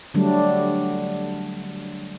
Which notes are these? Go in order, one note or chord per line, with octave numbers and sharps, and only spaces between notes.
D3 F#3 G3 A3 D4